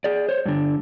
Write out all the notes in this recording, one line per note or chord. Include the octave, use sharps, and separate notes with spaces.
G#4 D5
C5 C#5
G2 D3